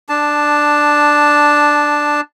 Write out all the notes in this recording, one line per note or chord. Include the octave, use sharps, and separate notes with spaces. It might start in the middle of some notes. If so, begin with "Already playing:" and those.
D4 A5